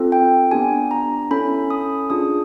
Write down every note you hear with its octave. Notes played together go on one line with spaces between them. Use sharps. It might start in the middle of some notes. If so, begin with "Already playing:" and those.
Already playing: C4 F4 A4
G5
B3 D4 G4 G#5
A#5
C#4 E4 A4 B5
D#6
D4 F4 G#4 D#6